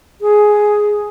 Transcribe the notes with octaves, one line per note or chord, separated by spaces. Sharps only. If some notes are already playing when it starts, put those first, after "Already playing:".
G#4